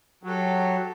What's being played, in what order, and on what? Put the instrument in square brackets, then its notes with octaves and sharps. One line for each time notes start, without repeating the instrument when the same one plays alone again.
[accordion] F#3 [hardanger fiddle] G4 A4